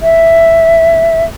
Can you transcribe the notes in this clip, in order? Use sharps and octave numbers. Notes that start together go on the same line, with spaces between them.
E5